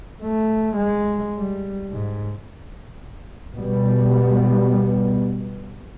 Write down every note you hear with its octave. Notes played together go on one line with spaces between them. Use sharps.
A3
G#3
G3
G#2
B2 G3 B3